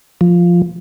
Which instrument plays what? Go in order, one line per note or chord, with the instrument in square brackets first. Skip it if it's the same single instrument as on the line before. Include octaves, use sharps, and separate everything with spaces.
[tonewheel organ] F3